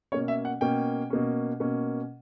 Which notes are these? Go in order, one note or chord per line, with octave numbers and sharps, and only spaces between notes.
B2 A#3 C#4 C#5
E5
F#5
B2 A#3 C#4 G5
B2 A#3 C#4
B2 A#3 C#4